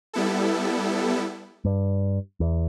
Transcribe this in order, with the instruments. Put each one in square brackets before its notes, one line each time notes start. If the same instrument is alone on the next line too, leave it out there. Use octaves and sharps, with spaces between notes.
[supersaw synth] G3 B3 E4 A4
[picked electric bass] G2
E2